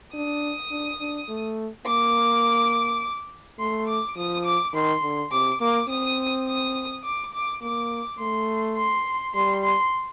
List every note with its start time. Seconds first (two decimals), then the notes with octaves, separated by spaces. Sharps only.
0.14 D4 D#6
0.71 D4
1.00 D4
1.29 A3
1.86 A#3 D6
3.59 A3 C6
3.88 D6
4.16 F3 D#6
4.45 D6
4.73 D#3 C6
5.03 D3
5.32 C3 D6
5.60 A#3 D6
5.89 C4 D#6
6.47 D#6
7.03 D6
7.33 D6
7.61 A#3 D6
8.19 A3 C6
8.77 C6
9.34 G3 C6
9.63 C6